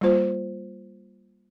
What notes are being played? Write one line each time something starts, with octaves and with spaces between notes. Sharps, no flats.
G3 A#3 F4 C5